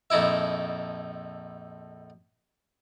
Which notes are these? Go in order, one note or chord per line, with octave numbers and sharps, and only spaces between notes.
A#1 F2 D#4 E4 E5